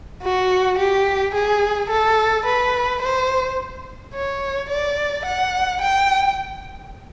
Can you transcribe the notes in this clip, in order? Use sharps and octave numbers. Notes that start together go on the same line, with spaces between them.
F#4
G4
G#4
A4
B4
C5
C#5
D5
F#5
G5